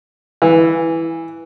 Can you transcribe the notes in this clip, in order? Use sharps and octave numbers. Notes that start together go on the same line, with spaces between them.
E3